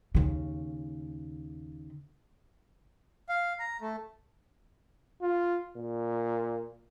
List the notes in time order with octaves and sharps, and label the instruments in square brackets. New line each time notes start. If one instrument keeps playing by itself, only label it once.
[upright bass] D#2 C#3
[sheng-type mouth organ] F5
A#5
A3
[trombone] F4
A#2